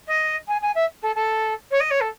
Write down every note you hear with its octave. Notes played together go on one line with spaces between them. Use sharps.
D#5
G#5
G#5
E5
A4
A4
C#5
D#5
C#5
A4